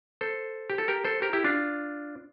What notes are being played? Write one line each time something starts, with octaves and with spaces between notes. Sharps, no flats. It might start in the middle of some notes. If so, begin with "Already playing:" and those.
A4 C5
G4
A4
G4 A#4
A4 C5
G4 A#4
E4 G4
D4 F4